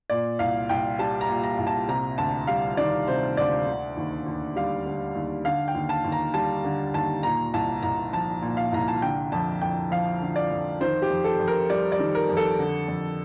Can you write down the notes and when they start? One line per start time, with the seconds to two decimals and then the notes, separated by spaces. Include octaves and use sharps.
0.10 A#2 D5
0.39 C2 F5
0.69 C2 G5
0.99 G3 A5
1.21 A#5
1.29 A#2
1.44 A#5
1.58 C2
1.67 A5
1.88 C3 A#5
2.18 D2 A5
2.47 G3 F5
2.77 D#3 D5
3.08 C3 C5
3.37 D2 D5
3.67 D3
3.97 D#2
4.27 D#2
4.56 G3 F5
4.86 D3
5.15 D#2
5.45 D3 F5
5.68 G5
5.75 D#2
5.89 A5
6.05 D#2
6.12 A#5
6.34 G3 A5
6.64 D3
6.94 D#2 A5
7.23 A#2 A#5
7.54 C2 A5
7.83 C2 A#5
8.13 F3 A5
8.42 A#2
8.57 F5
8.72 C2 A#5
8.88 A5
9.02 D3 G5
9.32 F2 A5
9.62 F2 G5
9.91 F3 F5
10.22 D3
10.36 D5
10.51 F2
10.81 D#3 C5
11.02 G4
11.10 F2
11.24 A4
11.39 F2
11.48 A#4
11.69 G3 D5
11.92 D5
11.99 D#3
12.15 A#4
12.29 F2
12.37 A4
12.59 D3
12.88 F2